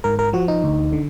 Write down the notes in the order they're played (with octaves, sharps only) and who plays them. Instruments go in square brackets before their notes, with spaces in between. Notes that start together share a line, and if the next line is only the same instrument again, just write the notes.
[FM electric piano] G#2 A#4
A#4
F3 F#4
D#4
D2
D3